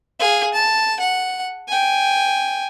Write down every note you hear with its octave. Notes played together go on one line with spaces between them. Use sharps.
G#4 F5
A5
F#5
G5 G#5